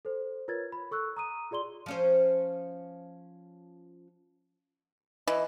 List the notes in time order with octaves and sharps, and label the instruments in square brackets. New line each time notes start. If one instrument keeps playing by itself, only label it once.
[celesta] A4 C5
F4 A#4 B4 C#5 G#6 A6
B5
A4 C#6 E6 F#6
A#5 D#6 D#7
F4 G#4 D5 C6 G7
[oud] F3 C#4 C5
[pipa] E3 [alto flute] D#5